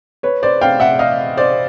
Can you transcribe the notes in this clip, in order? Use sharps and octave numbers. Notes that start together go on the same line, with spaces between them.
B4 C#5
C5 D5
F5 G5
E5 F#5
D#5 F5
C5 D5